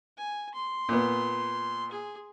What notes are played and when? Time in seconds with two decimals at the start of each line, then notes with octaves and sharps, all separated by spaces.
0.18 G#5
0.54 C6
0.89 A#2 B3
1.91 G#4